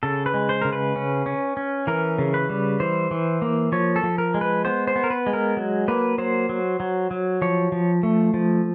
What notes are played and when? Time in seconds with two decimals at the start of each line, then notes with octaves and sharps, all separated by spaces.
0.03 C#3 A4
0.26 B4
0.34 G#3
0.49 C5
0.62 C#3 A#4
0.73 B4
0.96 C#4
1.26 C#4
1.57 C#4
1.87 E3 A#4
2.18 C#3
2.34 B4
2.49 G3
2.80 E3 C5
3.11 E3
3.42 A#3
3.72 F3 C#5
3.96 A4
4.03 F3
4.18 A#4
4.34 G#3
4.41 B4
4.65 B3 C5
4.87 C5
4.96 B3
5.04 A#4
5.10 B4
5.27 G#3
5.33 A#4
5.57 F#3
5.88 A#3 B4
6.18 F#3 C5
6.49 F#3
6.80 F#3
7.11 F#3
7.42 F3 C#5
7.72 F3
8.03 A3
8.34 F3